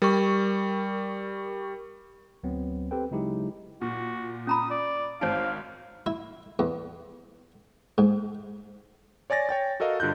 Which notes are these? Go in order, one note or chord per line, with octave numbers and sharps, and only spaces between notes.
G3 A#4 C#6
D2 F#3 B3 C4
C4 G4 A4 B4 G5
C#3 F#3 G#3 D#4 E4 G4
A#2 F#4
C#4 A#5 B5 D#6
D5
G#1 C4 D#4 C#5 F5 D7
E4
E2
G#2
C#5 D5 G#5 A6 A#6
C#5 G5 A6
F#4 A4 A#4 D#5 F5
G2 D3 F4 F#6 G6